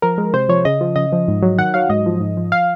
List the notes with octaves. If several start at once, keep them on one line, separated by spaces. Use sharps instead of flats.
F3 A#4
G#3
C3 C5
F3 C#5
C#3 D#5
F3
C#3 D#5
F3
G#2
F#3
D#3 F#5
F#3 F5
G#2 D#5
F3
G#2
F3
F5